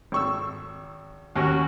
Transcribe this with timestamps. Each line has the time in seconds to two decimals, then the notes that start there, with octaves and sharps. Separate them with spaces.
0.12 G#1 C#6 E6
1.36 D#2 C#4 F#4